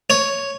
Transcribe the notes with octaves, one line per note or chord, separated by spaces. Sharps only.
C#5